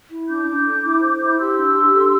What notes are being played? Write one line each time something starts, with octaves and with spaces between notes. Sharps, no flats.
E4
D4 D6 G6
D4
A4
E4
C5
E4
G6
G4 C6 E6
D4
G4
A4